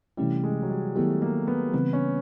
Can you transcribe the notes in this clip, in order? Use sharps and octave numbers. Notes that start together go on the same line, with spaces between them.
C3 E3 G3 A3 C#4 E4
G#3
F#3
G3
D#3 F#3 A3 B3 E4 G4
A#3
B3
C#3 E3 G3 B3 C4
C#4